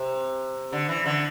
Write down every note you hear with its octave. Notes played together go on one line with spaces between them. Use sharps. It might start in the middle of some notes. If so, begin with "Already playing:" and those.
Already playing: C3
D3
E3
D3